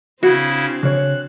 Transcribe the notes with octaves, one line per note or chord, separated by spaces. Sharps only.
C#3 C4 D4 E4 F#4
C#3 C#5 F#6